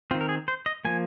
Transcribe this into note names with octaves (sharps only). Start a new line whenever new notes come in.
D#3 C4 F4
A#4
G#4
C5
D#5
F3 A#3 G#5